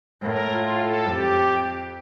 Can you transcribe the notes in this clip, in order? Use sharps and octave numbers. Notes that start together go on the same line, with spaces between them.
A2 A#4
F4
A4
F2 G4